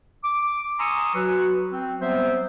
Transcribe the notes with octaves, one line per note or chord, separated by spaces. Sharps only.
D6
G#5 A#5 C6 C#6 D#6 E6
F#3 F#4 B4
C4
F#3 G3 B3 C4 C5 E5